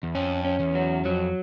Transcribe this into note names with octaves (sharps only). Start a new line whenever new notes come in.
E2
F2 C#4
C#4
E2
F#3
F2 F#3